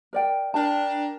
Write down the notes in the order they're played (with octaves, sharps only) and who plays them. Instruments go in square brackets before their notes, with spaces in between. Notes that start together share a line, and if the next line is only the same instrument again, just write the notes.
[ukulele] A#4 D5 G5
[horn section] D4 A#4 G5 [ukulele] A5